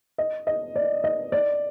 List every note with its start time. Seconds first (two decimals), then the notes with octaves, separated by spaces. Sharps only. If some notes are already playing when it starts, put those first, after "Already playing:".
0.18 D#5
0.47 D#5
0.76 D5
1.04 D#5
1.32 D5